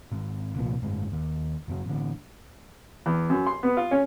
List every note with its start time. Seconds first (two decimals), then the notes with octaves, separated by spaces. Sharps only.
0.12 G#1
0.56 C2 A#2 F3
0.82 F#1 G#2
1.12 D#2
1.68 F#1 F#2 B2 F#3
1.86 A1 D3
3.06 E2
3.30 F#2
3.46 C6
3.63 B3
3.77 F4
3.91 C#4